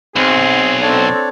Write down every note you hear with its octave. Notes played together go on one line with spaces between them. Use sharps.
B1 C4 G#4
C4 D4 A4 C#5 D5